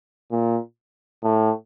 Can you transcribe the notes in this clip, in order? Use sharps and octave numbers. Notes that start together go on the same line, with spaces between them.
A#2
A2